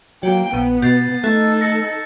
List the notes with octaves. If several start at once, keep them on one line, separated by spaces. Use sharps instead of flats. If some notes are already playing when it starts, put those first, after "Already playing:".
F#3 A#3 G5
A#1 B3 D#7
B2 G6 A6 C7
A3 D#4 A4 F#6 A6
A#6 C#7